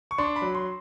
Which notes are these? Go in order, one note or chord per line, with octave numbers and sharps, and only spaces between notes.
C#6
D4 C6
B5
F#3
C6